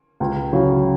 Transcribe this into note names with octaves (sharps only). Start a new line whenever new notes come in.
C#2
C#3 F#3